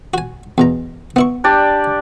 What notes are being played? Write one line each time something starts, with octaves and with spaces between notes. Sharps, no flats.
F#4 G#5
E2 B2 A#5
B3 E4 C#6
D4 G4 D5